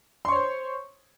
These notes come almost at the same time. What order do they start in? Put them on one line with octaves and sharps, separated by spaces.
C6 C#6 C#5 C5